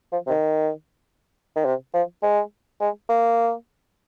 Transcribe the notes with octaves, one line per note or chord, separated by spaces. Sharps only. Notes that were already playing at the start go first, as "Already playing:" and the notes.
F3
C3
D#3
D#3
C3
F3
G#3
G#3
A#3